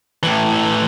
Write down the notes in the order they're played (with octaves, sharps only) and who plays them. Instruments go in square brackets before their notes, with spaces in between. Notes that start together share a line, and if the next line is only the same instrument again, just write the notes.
[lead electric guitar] A2 E3